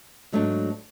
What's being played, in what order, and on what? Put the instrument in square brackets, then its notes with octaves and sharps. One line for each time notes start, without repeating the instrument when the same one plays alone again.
[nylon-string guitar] G#2 F#3 A3 D4